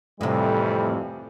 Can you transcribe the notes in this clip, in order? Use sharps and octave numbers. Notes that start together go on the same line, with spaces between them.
F2 A2 C3 E3 G3